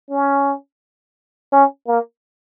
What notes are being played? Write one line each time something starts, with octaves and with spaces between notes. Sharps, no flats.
C#4
C#4
A#3